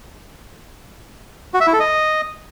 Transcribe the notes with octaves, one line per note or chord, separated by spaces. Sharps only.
F#4
E5
E4
A4
D#5